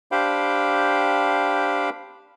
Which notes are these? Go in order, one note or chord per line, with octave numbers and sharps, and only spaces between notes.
D4 G4 C5 F5 G5 B5